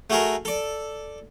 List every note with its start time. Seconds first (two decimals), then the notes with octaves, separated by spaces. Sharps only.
0.10 A3 F#4 G#4 A#4
0.45 A4 D5